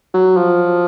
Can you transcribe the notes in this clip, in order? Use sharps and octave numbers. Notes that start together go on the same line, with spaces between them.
F#3
F3